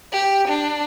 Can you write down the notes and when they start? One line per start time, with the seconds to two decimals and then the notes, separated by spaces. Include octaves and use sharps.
0.12 G4
0.48 D4